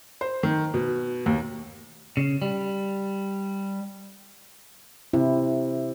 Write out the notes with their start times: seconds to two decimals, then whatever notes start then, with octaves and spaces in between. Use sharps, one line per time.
0.21 C5
0.43 D#3
0.74 B2
1.26 D#2
2.17 C#3
2.42 G3
5.13 C3 E4